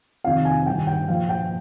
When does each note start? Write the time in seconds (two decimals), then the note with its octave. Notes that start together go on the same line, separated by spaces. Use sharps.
0.24 F2 C3 D#3 F5
0.45 G#5
0.66 G2 D#3 G5
0.87 G5
1.08 A#2 F3 F5
1.29 G5